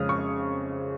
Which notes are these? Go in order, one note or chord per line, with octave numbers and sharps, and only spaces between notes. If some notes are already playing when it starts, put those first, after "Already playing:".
Already playing: F2 C#3 G#3 C#4 D#6 F6
C#6